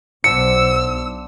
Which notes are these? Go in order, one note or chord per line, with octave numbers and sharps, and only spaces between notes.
B1 D4 C5 F#5 E6 C#7